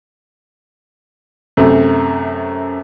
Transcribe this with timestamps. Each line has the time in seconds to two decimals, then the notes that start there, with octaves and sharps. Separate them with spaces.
1.57 F#2 C3 A3